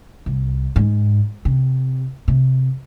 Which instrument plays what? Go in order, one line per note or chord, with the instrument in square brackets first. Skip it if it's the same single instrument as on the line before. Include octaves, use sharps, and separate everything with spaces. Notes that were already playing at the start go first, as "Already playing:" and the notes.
[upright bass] C2
G#2
C3
C3